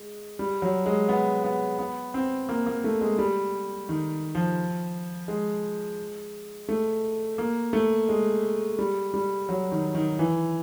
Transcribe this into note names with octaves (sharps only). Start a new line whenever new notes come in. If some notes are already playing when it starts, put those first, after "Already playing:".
Already playing: G#3
G3
F#3
G#3
B3
B3
B3
C4
A#3
A#3
A3
G#3
G3
D#3
F3
G#3
A3
A#3
A3
G#3
G3
G3
F#3
D#3
D#3
E3